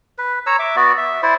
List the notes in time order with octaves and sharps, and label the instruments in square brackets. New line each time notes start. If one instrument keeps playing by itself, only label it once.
[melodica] B4
C#5 A#5 E6
E5 D6
B3 F#4 D5
E5
E4 C5 D5